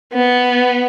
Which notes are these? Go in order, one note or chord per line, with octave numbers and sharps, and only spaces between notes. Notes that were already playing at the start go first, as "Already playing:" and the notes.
B3